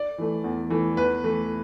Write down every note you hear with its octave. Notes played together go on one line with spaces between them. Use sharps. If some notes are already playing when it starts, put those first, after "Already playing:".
Already playing: D5
E3 A3
E2
E3 A3
E2 B4
E3 A3